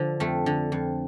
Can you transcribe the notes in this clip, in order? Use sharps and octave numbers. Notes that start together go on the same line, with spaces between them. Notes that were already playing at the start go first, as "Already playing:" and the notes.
Already playing: D3 F3
F2 A3
D3
F2